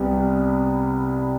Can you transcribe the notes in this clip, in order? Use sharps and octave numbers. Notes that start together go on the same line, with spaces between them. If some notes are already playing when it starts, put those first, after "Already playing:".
Already playing: C2 C3 G3 B3